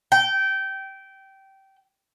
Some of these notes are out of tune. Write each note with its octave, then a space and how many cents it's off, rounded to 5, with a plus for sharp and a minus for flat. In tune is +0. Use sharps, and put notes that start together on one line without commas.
G5 -20